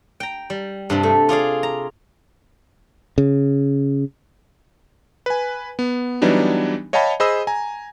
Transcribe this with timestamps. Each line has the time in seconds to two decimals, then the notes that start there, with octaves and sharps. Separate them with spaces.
0.20 G5 A#5
0.50 G3
0.90 G2 C3 G3
1.03 A3
1.29 F4 G#4 D5 F5
1.63 A#5
3.18 C#3
5.26 B4 G#5
5.79 B3
6.22 E3 F#3 G3 B3 D4 D#4
6.93 C#5 D#5 F5 G5 A5 B5
7.20 G#4 C5 D#5 B5 D#6 E6
7.47 G#5 A#5